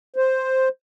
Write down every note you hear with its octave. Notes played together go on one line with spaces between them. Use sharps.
C5